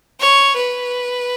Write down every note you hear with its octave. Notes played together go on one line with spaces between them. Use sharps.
C#5
B4